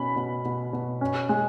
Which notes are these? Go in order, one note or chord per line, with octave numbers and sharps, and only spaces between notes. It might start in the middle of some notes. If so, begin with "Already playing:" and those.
Already playing: B2 C#4 B5
B2
B2
B2
C#4
G#3